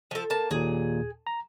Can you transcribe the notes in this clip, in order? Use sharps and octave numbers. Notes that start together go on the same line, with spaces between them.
F3 A4
A#3 A5
D#2 A#2 G#4
A#5